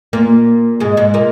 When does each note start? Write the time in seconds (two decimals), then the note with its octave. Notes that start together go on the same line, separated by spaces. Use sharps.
0.13 A#2 A#3
0.80 G#2 G#3
0.97 G#2 G#3
1.14 A#2 A#3